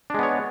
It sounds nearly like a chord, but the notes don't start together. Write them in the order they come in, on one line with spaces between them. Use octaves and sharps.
D4 G#3 B3 C#5